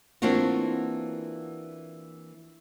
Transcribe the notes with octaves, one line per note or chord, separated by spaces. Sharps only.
E3 A#3 C4 D4 F4 F#4